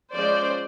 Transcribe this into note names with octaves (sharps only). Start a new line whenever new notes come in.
F3 G#3 C#4 C5 D5